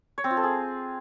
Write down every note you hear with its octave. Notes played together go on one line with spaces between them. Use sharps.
C#5
C4
F4
A4
G#4